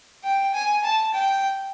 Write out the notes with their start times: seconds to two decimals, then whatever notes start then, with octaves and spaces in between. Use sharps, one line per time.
0.24 G5
0.54 G#5
0.84 A5
1.14 G5